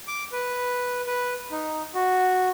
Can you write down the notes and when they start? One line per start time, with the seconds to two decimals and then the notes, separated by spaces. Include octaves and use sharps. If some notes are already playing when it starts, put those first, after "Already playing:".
0.08 D6
0.32 B4
1.07 B4
1.51 D#4
1.94 F#4